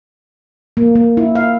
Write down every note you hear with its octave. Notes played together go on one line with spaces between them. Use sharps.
A#3
A#3
E4
F5